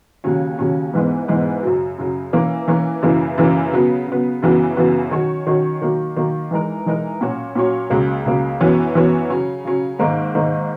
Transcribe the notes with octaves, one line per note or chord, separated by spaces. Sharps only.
D#2 C#3 F#3 C#4
D#2 C#3 F#3 C#4
G#2 E3 G#3 B3
G#2 E3 G#3 B3
F#2 C#3 F#3
F#2 C#3 F#3
E3 A#3 C#4
E3 A#3 C#4
F#2 C#3 E3 A#3 E4
F#2 C#3 E3 A#3 E4
C#3 F#3 B3
C#3 F#3 B3
F#2 C#3 E3 B3 F#4
F#2 C#3 E3 B3 F#4
D#3 F#3 C#4 F#4 C#5
D#3 F#3 C#4 F#4 C#5
D#3 F#3 A#3
D#3 F#3 A#3
E3 G#3 D#4 A#4
E3 G#3 D#4 A#4
A#2 F#3 C#4 F#4 C#5
A#2 F#3 C#4 F#4 C#5
C#2 C#3 F#3 A#3
C#2 C#3 F#3 A#3
F#2 E3 B3 F#4 C#5
F#2 E3 B3 F#4 C#5
C#3 F#3 C#4
C#3 F#3 C#4
G#2 D#3 A#3 D#4
G#2 D#3 A#3 D#4